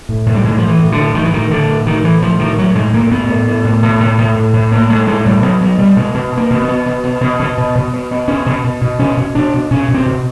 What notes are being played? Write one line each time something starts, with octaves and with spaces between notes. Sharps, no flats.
A2
A2
G3
A2 G#3
A2 F3
E3
A2
D3
A2
A2 D#3
E3
A2 D#3
A2 D3
A2
A2 D#3
A2 E3
A2 F3
A2 D#3
A2 F#3
A2 G#3
A2 A#3
A2 B3
A2
A2
A2
A2
A2
A2
A2
A2
A2 A#3
A2 G#3
A2 G#3
A2 G3
B2 F#3
B2 F#3
B2 G3
B2 G#3
B2
B2
A#3
B2
B3
B2
B2
B2
B2
B2
B2
B2
B2
B2
B2 C#4
B2
B2
B2
B2 C#4
B2
B2 D4
B2
B2 C#4
B2
C4
B2